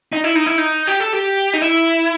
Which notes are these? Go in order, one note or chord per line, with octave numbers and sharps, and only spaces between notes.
D#4
E4
D#4
E4
D#4
G4
A4
G4
D#4
E4